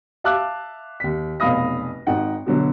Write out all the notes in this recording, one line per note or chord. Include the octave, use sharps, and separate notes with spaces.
E5 F5 A5 D6 E6 F#6
D#2 B6
F1 B1 F5 B5 D#6 A#6
G#1 D#4 F#5 G5
B2 D3 F#3